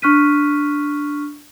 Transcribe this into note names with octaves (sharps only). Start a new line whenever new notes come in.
D4 C#6 F6 F#6 B6 D#7